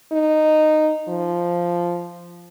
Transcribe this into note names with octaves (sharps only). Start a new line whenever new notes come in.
D#4
F3